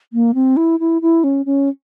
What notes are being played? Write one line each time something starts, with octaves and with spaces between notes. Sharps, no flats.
A#3
C4
E4
E4
E4
C#4
C#4